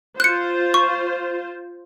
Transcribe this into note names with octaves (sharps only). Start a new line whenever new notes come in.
F4 C5 F#6 C#7
C#6